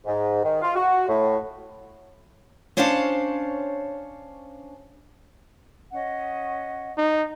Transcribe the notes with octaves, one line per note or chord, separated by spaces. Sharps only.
G#2
D#3
F4
F#4
A2
C#4 D4 C5 C#5 F5 A5
C#4 D#5 F#5
D#4